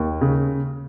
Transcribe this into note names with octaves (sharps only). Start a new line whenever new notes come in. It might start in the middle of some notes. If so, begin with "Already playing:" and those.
Already playing: D#2
C#3